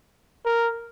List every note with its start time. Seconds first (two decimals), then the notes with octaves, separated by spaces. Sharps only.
0.46 A#4